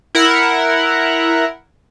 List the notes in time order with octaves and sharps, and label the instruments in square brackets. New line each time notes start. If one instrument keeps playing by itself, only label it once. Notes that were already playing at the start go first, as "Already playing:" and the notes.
[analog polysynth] E4 A#4 F#5